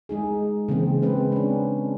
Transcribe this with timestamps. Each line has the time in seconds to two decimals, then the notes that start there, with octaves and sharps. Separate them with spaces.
0.09 G#3 D#4 G#4
0.68 C#3 E3 A#3 C4
1.02 G#3 C4 B4
1.32 C#4 D4